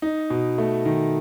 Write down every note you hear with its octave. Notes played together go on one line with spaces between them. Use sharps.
D#4
B2
A3
D#3